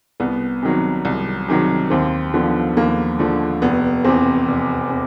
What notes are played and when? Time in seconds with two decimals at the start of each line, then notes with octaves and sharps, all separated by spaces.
0.20 C2 B3
0.62 C3 D#3 F#3
1.05 C2
1.48 C3 D#3 F#3
1.90 D#2 C4
2.34 D3 F3 B3
2.76 D#2 A#3
3.19 D3 F3 A3
3.62 F1 B3
4.04 E2 C3 C4
4.48 F1
4.90 C3